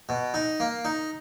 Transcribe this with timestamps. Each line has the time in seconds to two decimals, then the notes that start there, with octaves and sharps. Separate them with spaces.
0.09 B2
0.34 D#4
0.60 A#3
0.85 D#4